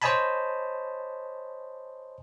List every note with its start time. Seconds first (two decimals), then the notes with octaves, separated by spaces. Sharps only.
0.02 C5 C#5 D#5 G#5 A5 B5